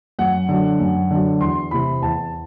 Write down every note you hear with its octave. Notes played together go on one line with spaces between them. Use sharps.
F#2 F#5
D3 F#3
F#2
D3 F#3
E2 C6
C3 E3 B5
E2 A5